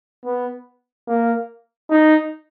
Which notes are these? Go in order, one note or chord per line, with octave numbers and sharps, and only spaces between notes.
B3
A#3
D#4